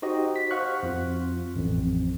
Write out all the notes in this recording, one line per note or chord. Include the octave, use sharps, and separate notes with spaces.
D#4 F#4 G4 C5 D#5
B6
C5 F5 F#5 C#6 F6 F#6
F2 F4
A1 F2